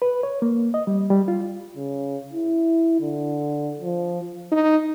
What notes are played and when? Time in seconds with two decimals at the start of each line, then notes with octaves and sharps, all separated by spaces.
0.02 B4
0.23 C#5
0.42 A#3
0.74 D#5
0.87 G3
1.10 G3
1.28 F4
1.76 C#3
2.33 E4
3.00 D3
3.80 F3
4.52 D#4